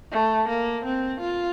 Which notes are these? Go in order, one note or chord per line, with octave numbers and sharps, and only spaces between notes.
A3
A#3
C4
F4